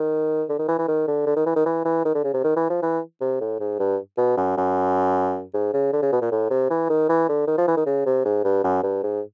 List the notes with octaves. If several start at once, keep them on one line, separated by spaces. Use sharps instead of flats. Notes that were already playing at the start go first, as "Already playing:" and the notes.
Already playing: D#3
D3
D#3
E3
E3
D#3
D3
D3
D#3
E3
D#3
E3
E3
D#3
D3
C#3
C3
D#3
E3
F3
E3
C3
A2
G#2
G2
B2
F#2
F#2
G#2
C#3
D3
C#3
B2
A#2
A2
C3
E3
D#3
E3
D3
D#3
F3
E3
D#3
C#3
C3
G#2
G2
F#2
G2
G#2